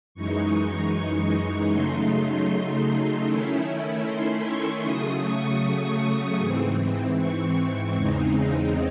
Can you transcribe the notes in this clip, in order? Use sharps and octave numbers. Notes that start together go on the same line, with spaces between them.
F#2 E3 G#3 D#4 C#6
C#3 F#3 A3 D#4 C6
C6
D#3 A3 C#4 E4
C6
C#6
C#3 F#3 A3 D#6
C#6
D#6
G#2 E3 C4
C#6
E2 C#3 G#3 C4 D#4